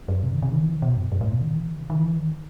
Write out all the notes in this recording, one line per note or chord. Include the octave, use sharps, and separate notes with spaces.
F#2
C3
D#3
C3
D#3
E3
D#3
B2
F#2
F#2
A2
B2
D#3
E3
D#3
C3
D#3
E3
D#3